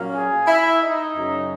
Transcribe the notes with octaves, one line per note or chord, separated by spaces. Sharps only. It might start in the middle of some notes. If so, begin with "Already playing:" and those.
Already playing: A#2 F#3 A#3 C#4
G#4 G#5
E4 E5
D#4 D#5
F#2 C#3 F#3